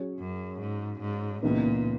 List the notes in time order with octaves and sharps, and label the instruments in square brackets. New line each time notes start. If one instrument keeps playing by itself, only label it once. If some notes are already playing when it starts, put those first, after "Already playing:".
Already playing: [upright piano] F#3 C#4 G#4 C#5
[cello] F#2
G#2
G#2
[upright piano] C#2 C#3 E3 B3 D#4 [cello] A#2